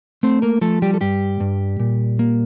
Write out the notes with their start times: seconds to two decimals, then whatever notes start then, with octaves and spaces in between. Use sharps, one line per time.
0.23 A3 C4 C5
0.42 A#3 A#4
0.61 F3 A3 A4
0.82 G3 G4
0.94 A4
1.01 G2 G3 G4
1.40 G2
1.80 A#2
2.19 A#3